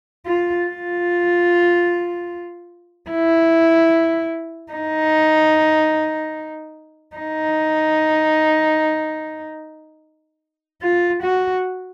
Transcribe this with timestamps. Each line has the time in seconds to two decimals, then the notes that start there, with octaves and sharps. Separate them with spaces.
0.26 F4
0.67 F4
3.11 E4
4.73 D#4
7.16 D#4
10.82 F4
11.23 F#4